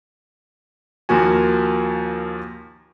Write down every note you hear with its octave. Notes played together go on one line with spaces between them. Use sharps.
D#2 F3 A#3 F#4 G#5